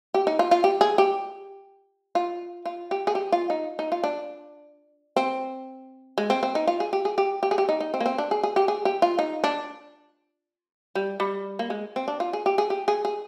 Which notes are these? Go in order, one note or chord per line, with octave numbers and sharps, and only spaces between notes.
G4
D#4
F4
F4
G4
G#4
G4
F4
F4
G4
G#4
G4
F4
D#4
D#4
F4
D4
C4
G#3
C4
C4
D#4
F4
G#4
G4
G#4
G4
G4
G#4
G4
D#4
D#4
C4
A#3
C4
D4
G#4
G#4
G4
G#4
G4
F4
D#4
D4
G3
G3
A#3
G#3
C4
D4
F4
G#4
G4
G#4
G4
G#4
G#4